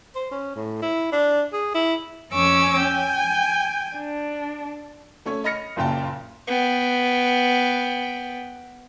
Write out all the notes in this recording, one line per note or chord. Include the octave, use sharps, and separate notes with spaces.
C5
C#4
A2
E4
D4
G#4
E4
F2 C#4 G#5 C#6 D6 E6
G5 G#5
D4
A3 C#4 C#5
D#5 B5 F6 A#6 C#7
F#1 A#2 C#3 G5 A5
B3 G5